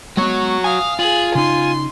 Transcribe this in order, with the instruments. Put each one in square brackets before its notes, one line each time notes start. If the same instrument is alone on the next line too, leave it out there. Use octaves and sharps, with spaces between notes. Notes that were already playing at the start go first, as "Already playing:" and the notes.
[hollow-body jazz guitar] G#3 B3 [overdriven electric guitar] F#4 C#5 [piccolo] C#6
[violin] F5 [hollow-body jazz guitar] G#5 [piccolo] D#6
[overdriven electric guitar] F4 [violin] G#4 [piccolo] F#7
[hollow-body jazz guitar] C#3 D#4 [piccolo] G#5 [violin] C6